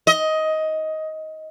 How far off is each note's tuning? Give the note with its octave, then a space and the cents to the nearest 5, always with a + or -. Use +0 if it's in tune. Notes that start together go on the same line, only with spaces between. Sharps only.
D#5 +15